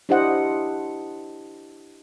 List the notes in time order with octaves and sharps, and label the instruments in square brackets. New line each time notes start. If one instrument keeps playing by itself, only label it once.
[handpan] D4 E4 G4 C5 D#5 F#5